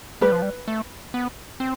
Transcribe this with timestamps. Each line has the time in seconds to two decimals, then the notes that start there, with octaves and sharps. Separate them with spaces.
0.21 G3 B4
0.32 F3
0.42 G3
0.68 A3
1.14 B3
1.60 C4